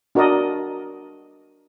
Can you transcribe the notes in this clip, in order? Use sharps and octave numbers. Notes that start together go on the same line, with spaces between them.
D4 F#4 A#4 D5 D#5